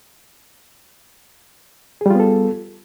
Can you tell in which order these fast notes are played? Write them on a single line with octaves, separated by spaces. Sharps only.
G#4 G3 F4 B3 A4